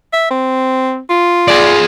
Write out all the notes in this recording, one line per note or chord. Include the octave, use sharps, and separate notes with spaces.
E5
C4
F4
G#4 D5